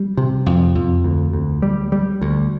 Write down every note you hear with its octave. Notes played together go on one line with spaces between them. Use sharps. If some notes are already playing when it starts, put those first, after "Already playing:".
Already playing: G3
C3
F2
F2
D2
D2
G3
G3
D2